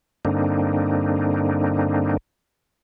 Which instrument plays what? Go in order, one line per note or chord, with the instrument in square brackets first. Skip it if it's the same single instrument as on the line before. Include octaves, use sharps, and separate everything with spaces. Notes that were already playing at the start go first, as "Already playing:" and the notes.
[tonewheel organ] G2 D3 A#3 C4 D4 D#4